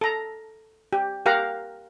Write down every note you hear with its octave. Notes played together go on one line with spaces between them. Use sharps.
A4 A#5
G4
G4 A#4 F5 F#5 A#5